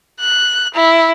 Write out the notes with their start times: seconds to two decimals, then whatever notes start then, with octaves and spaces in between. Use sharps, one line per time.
0.21 F#6
0.74 E4